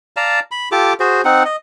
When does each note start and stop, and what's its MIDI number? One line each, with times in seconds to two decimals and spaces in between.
0.17 0.40 74
0.17 0.40 77
0.17 0.40 81
0.17 0.40 82
0.51 0.69 83
0.72 0.93 65
0.72 0.93 67
0.72 0.93 69
0.72 0.93 86
1.00 1.22 66
1.00 1.22 68
1.00 1.22 72
1.25 1.43 60
1.25 1.43 63
1.25 1.43 78
1.45 1.56 75